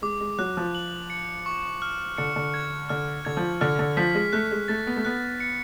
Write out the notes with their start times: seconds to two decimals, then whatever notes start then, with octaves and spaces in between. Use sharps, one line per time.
0.02 G#3 D6
0.21 G#3
0.38 F#3 F#6
0.57 F3
0.75 F#7
1.10 C#7
1.46 C#6
1.82 F6
2.18 D3 C#7
2.36 D3
2.54 G#6
2.89 D3 F6
3.25 D3 G#6
3.37 F3
3.61 D3 F6
3.79 D3
3.97 F3 B6
4.15 G#3
4.33 A3 F#6
4.51 G#3
4.68 A3 A6
4.87 B3
4.97 A3
5.05 B3 F#6
5.40 C#7